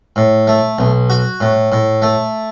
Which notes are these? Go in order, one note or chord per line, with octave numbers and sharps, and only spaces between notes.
A2
A3
B1
F#4
A2
A2
A3